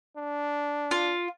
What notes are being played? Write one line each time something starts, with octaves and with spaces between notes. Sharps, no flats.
D4
F4